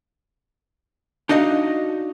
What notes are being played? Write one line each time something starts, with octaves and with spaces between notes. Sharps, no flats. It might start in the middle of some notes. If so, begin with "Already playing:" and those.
D4 D#4 F#4 D#5 F5